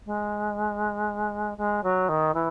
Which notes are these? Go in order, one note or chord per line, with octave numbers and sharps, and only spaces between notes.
G#3
G#3
F#3
D#3
E3